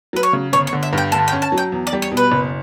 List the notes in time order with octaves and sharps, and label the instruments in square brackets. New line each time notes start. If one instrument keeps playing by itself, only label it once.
[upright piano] F#3 [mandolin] B4
[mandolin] C#5
[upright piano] C#3
[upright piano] G1 [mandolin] C#5
[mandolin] C#5
[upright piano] D3
[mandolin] E5
[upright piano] G2 [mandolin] G5
[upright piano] D3 [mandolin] A5
[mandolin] G5
[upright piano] C#4
[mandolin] A5
[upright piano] F#3
[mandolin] G5
[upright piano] E2
[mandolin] D5
[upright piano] G3
[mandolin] C#5
[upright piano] B2
[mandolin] B4
[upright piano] F#1